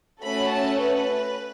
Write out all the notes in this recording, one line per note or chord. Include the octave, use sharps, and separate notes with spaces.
A3 C#4 F#4 A4 B5
A5
B4